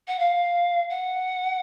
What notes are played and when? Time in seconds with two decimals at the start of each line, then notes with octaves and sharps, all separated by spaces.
0.08 F#5
0.19 F5
0.90 F#5